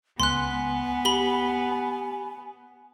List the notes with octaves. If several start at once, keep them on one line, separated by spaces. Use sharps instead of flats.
C#2 B3 G#5 C6 F#6
G4 B5 G7